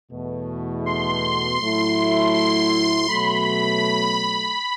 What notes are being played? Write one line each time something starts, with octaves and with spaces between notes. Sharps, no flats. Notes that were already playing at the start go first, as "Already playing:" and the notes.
E2 B2 A3
C6
A2 F#3 A3 E4
C6
B2 F#3 A3 B5